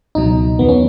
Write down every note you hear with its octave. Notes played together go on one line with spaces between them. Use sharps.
C#2 B2 F#3 D#4
E2 D#3 F#3 B3
C#4